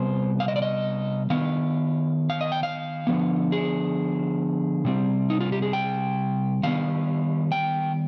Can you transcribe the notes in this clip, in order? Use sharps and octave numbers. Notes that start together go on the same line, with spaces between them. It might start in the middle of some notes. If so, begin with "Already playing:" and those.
Already playing: C3 G3 B3 C5
F5
D#5
D5
D#5
D#3 B3 F5
F5
D#5
G5
F5
D3 F3 B3
G#4
C3 G3 C4
D#4
F4
G4
G#4
G5
D#3 G3 B3 F5
G5